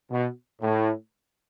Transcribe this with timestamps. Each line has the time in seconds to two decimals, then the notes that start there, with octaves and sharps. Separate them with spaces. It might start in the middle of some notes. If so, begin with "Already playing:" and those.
0.11 B2
0.62 A2